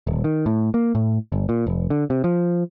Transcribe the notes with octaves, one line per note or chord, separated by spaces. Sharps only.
D#1
D#3
A2
A#3
A2
G1
A#2
F1
D3
C3
F3